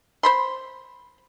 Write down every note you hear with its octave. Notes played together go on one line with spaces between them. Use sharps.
C5 B5 C6